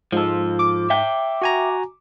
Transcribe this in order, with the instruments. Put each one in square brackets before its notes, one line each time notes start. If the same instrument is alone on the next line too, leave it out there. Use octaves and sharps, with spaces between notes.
[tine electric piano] G#2 [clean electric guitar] F3 A4 [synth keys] G#3
[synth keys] D6
[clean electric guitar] E5 G5
[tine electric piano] F#4 G#5 A#5